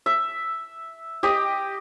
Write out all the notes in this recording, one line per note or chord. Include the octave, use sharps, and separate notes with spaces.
E5
G4 D#5